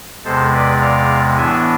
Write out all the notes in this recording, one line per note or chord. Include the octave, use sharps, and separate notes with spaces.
E2 C3 G#3 A4 C5
B4 D5
D5 F5
A2 E3 B3 D4 E5 G#5